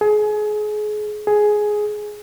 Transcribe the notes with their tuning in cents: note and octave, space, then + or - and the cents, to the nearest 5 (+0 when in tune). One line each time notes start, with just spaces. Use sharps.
G#4 +30
G#4 +10